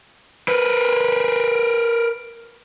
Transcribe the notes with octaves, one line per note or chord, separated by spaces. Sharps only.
A#4 B4